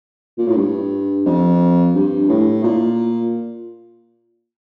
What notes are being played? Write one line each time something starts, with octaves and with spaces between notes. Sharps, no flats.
A#2
A2
G2
F2
G2
A2
A#2